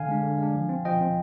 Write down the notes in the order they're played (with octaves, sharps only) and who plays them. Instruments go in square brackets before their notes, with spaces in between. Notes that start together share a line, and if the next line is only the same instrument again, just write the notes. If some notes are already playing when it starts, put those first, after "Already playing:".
Already playing: [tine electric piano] D3 F5 G#5
G#3 D4
D3
G#3 D4
F3
C4
F3 D#5 G5
C4